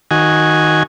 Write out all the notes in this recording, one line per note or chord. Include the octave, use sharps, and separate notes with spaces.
D#3 F#4 G#5